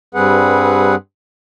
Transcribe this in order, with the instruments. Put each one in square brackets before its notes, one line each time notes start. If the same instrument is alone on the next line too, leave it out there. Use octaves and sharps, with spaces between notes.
[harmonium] G2 G3 C4 G#4 B4 F#5